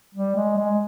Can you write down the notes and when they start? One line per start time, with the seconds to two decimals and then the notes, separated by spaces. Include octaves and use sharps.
0.14 G3
0.36 G#3
0.57 G#3